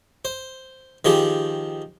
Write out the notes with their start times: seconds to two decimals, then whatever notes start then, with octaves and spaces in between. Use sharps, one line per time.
0.25 C5
1.05 D#3 F3 G4 G#4